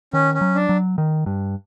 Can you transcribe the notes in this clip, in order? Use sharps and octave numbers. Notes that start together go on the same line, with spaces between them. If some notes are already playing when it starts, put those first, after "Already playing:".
D#3 C#4
C#4
F#3
D4
F#3
D#3
G2